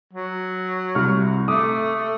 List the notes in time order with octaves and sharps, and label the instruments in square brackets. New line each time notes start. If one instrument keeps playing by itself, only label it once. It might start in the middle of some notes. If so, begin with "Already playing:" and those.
[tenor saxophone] F#3
[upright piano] C2 C#6 F6
[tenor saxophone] A3 [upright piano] D6 D#6
[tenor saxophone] A3